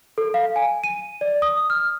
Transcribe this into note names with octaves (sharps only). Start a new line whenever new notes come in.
A4
F5
G#5
D#7
D5
D#6
F6